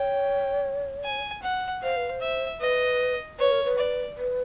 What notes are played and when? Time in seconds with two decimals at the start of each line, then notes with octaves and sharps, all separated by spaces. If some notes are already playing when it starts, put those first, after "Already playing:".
Already playing: C#5 G5
1.04 G#5
1.43 F#5
1.82 C5 F5
1.96 B4
2.10 C5
2.21 E5
2.61 B4 D#5
3.39 B4 C#5
3.51 A#4
3.64 B4
3.78 D5
4.17 B4